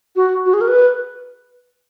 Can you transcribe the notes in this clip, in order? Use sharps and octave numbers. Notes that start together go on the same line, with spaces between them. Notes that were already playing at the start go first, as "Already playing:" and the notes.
F#4
F#4
G#4
A#4
B4